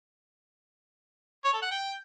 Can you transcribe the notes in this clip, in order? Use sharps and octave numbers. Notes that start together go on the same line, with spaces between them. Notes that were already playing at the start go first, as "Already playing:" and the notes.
C#5
A4
F#5
G5